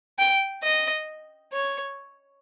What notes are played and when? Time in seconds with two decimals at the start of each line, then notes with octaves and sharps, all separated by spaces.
0.19 G5
0.63 D#5
1.53 C#5